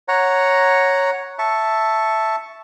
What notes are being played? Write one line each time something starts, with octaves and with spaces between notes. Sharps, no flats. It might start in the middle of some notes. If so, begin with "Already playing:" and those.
C#5 F#5 A#5
E5 A5 C#6